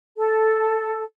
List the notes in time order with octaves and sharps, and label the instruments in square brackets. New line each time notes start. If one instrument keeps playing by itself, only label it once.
[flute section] A4